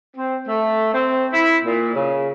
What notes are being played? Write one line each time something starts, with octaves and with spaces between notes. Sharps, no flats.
C4
A3
C4
E4
A#2
C#3